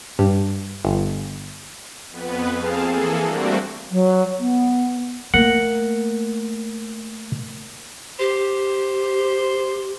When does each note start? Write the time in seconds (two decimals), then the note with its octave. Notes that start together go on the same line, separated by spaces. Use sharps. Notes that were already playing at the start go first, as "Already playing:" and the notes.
0.19 G2
0.85 G1
2.10 F2 B3 B4
2.54 F2 C4 G#4 F5 A5
2.85 E3 A#3 G#4 A4
3.23 G3 A3 A#3 C4 D4 F#4
3.91 F#3
4.39 B3
5.34 A3 A#3 A#4 F#5
8.19 G4 C5